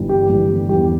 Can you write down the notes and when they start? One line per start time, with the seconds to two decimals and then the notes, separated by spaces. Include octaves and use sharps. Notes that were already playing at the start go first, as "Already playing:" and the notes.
Already playing: G1 G2 E3 G3
0.09 G4
0.30 G1 G2 E3 G3
0.69 E2 E3 G3 G4